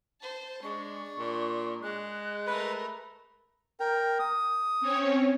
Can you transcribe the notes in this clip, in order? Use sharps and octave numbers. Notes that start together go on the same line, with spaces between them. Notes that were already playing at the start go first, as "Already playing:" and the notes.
C5 A5
G#3 D4 C#6
A#2
G#3 F#6
A3 A#4 B4
A#4 G5
D#6
C4 C#4 C#5